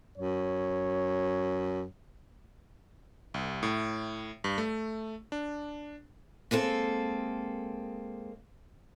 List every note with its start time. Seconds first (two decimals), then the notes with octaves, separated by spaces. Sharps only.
0.18 F#2 C#5
3.34 C2
3.63 A2
4.44 G2
4.58 A3
5.32 D4
6.51 G#3 A#3 C4 A4